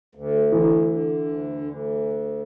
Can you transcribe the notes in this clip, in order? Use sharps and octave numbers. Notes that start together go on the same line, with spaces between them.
D2
D3 E3
D3
D2
D2